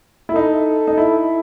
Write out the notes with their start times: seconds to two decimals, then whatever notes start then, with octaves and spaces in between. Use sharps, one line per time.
0.29 E4
0.35 D#4 A4
0.87 D#4
0.97 E4